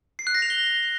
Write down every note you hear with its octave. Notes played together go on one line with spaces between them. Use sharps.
C7
F#6
A#6
F7
G7